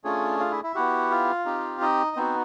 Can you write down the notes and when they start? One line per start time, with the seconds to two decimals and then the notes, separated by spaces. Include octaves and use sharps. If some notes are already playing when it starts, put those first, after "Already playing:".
0.04 A3 C#4 D4 F4 G#4 C#5
0.40 F4 F5
0.51 E4 E5
0.63 E4 E5
0.75 B3 E4 F#4 G4 F#5
1.11 F4 F5
1.45 C4 D#4 G4
1.81 D#4 D#5
2.16 B3 C4 D#4 F#4 C5